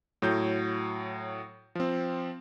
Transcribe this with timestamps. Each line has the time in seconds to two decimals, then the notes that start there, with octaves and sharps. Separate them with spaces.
0.22 A2 F#3 G6
1.75 F3 C4